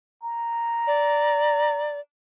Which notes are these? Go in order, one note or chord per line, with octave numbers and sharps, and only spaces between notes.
A#5
D5